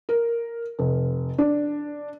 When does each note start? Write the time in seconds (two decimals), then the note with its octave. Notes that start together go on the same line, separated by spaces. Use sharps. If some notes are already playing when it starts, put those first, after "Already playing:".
0.09 A#4
0.79 F1
1.38 D4